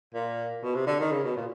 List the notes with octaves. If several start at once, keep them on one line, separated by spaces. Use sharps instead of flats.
A#2
B2
C3
D3
D#3
C#3
B2
A#2